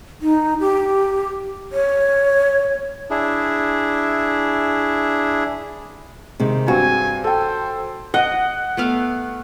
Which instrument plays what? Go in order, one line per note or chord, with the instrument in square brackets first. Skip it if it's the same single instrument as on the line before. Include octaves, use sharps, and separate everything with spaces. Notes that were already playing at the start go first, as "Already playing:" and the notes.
[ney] D#4
G4
C#5
[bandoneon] D4 E4 G#4
[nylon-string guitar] C3 D#3 G#3
[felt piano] G2 C4 [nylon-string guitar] F#4 [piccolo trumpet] G#5
[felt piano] A4 G5 [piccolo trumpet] C5
[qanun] D#5 [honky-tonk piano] F#5
[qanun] A3 B3 F5